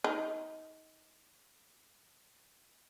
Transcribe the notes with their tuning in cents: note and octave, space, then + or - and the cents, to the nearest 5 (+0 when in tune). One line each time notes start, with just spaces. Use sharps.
D#4 +25